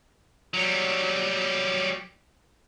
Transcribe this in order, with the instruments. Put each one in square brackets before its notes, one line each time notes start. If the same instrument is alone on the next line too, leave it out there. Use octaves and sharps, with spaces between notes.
[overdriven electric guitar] F#3 G3